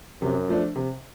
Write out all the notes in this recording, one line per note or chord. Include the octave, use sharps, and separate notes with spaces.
F#2 C3
F3 A3 D4
C3